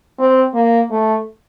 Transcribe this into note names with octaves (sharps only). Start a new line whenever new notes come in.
C4
A#3
A3